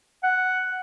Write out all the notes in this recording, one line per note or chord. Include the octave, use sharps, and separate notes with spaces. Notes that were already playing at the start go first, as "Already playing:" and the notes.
F#5